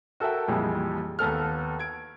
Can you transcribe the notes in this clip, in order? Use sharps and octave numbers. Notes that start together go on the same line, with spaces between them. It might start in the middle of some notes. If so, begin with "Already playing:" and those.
F#4 A4 A#4 E5 G5
A#1 F2 E3 G3 G#3
D#2 B3 A4 F6
G#6 D7